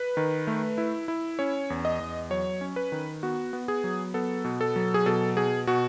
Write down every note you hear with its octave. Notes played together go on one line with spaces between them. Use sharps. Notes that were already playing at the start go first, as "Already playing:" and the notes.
Already playing: B4
D#3
A3
E4
E4
C#4 C#5
E2
D#5
E2
F#3 C#5
C#4
B4
D#3
B3 F#4
B3
G#4
F#3
B3 A4
B2
A4
F#3
G#4
B2 A4
B2 G#4
B2 F#4